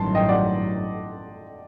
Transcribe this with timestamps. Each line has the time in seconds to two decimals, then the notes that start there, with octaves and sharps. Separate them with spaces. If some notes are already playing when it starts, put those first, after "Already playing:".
Already playing: A1 G2 D#3 F#3 A5 C6
0.15 D#5 G5
0.29 D5 F#5